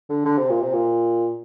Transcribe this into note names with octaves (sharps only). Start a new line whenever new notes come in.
D3
D3
C3
A#2
C3
A#2